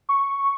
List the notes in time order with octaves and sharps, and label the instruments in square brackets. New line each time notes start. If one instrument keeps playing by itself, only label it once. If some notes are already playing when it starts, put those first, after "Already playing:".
[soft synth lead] C#6